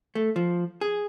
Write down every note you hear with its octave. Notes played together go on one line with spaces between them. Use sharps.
A3
F3
G#4